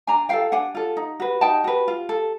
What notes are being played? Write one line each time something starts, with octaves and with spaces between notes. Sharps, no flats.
D4 G#5 A#5
F4 A4 F5 G5
D4 F#5 G#5
F4 A4
D#4
F#4 B4
D#4 G5 A5
F#4 B4
F4
A4